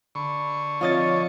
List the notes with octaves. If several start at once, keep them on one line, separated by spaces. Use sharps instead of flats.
D3 B5 C#6
F3 C4 F4 C#5 D#5 A6